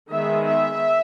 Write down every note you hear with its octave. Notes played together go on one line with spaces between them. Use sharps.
D#3 G#3 B3 E5
E5